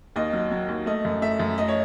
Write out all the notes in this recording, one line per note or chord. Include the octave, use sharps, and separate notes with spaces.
D#2 D#5
F#3
F#3
D#2
A3 D#5
F#2
A3 E5
F#2
A3 D#5
C#5